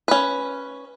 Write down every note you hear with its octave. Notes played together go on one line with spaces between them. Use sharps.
C#4 B4